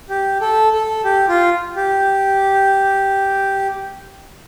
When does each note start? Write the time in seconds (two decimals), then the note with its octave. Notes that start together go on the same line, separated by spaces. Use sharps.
0.10 G4
0.41 A4
0.73 A4
1.05 G4
1.28 F4
1.76 G4